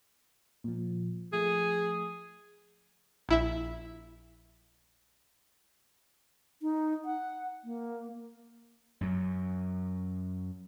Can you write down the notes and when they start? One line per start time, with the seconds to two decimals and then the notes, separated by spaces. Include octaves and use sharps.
0.64 A#2 F3
1.33 F3 A3 G#4 E5
3.29 A#1 E4 E5
6.62 D#4
7.05 F#5
7.64 A#3
9.01 F#2 F#3